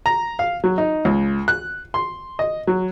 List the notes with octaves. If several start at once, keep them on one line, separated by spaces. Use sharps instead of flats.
A#5
F5
F#3
D#4
C#2
F#6
C6
D#5
F#3